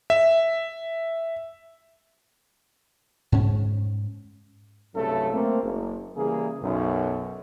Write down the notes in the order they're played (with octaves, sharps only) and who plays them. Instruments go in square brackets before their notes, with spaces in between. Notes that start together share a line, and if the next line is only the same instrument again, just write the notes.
[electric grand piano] E5
[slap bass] G#2 C#4
[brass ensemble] C2 G2 C#3 F#3 A3 A4
A3 A#3 C4
F#1
C#3 E3 G3 A#3 G#4
B1 F#2